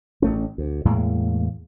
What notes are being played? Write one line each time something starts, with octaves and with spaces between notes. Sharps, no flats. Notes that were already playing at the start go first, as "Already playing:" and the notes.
A1 A3 C#4
D2
E2 A2 G#3 A#3